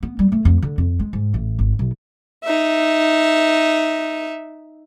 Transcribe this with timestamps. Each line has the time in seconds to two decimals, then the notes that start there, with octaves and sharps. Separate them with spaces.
0.03 B3
0.19 G3
0.32 A3
0.45 F2
0.62 D3
0.78 F2
1.00 G#3
1.13 G#2
1.34 A1
1.59 G#1
1.79 B1
2.44 D#4 E5